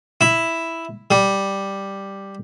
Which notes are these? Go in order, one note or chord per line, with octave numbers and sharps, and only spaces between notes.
E4
G3